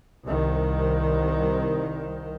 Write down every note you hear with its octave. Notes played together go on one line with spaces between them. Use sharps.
C2 D#3